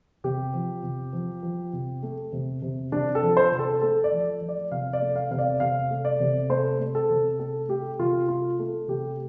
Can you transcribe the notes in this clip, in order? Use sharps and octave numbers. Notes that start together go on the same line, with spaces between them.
C3 G4
F3
C3
F3
F3
C3
A3
C3
C3
C3 D4
A4
F3
C5
C3
A4
A3 A4
D5
F3
F3
D5
C3 F5
D5
A3
F5
C3 F5
D5
C3 F5
A3
D5
C3
A3 C5
A3
A4
C3
A3 A4
A3 G4
C3 F4
A3 F4
A3
C3 G4